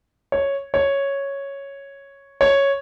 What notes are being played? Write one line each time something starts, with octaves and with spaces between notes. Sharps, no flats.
C#5
C#5
C#5